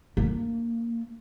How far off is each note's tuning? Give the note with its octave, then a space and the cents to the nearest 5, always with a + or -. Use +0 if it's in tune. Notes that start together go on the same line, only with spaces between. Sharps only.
A#3 -10 D4 +0